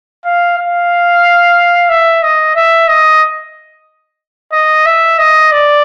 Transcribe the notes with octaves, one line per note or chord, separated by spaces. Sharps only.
F5
F5
E5
D#5
E5
D#5
D#5
E5
D#5
D5